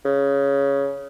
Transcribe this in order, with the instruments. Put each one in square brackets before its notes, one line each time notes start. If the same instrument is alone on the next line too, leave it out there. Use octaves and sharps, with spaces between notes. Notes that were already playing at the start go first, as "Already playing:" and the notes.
[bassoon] C#3